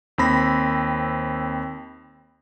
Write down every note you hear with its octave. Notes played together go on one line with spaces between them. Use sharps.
D#2 C4 B5 A#6